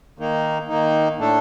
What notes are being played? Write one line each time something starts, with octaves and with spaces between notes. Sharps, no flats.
D#3 A#3 D#4
D#3 A#3 D#4
A2 A3 D4 A4